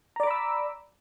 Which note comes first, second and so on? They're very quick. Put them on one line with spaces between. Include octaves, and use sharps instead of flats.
A#5 D5 D6 B5 E6